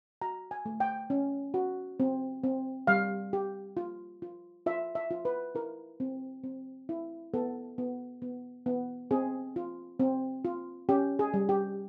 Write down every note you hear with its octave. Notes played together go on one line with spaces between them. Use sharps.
F#4 A#5
G#5
A3
G5
C#4
F#4
C4
C4
G3 F5
G4
F4
F4
F4 E5
E5
F4
B4
E4 A#4
C4
C4
E4
B3 A4
B3
B3
B3
C4 G#4
F4
C4
F4
C#4 G4
G#4
G3
G4